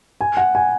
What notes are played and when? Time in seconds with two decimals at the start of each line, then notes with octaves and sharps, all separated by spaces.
0.21 G#5
0.37 F#5
0.55 G#5